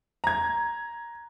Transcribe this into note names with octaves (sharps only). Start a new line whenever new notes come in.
A#5 G#6